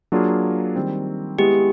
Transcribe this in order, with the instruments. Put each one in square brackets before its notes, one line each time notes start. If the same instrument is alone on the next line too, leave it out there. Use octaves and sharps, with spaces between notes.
[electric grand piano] F#3 A#3 D4 F4 G#4
D#3 G3 C4
[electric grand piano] G#3 B3 E4 G#4 [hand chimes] G4